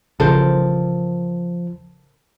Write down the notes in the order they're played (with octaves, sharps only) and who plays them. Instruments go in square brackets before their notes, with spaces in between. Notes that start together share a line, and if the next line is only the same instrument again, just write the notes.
[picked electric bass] A1 C#3 [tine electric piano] F3 [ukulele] A4 A#4 C5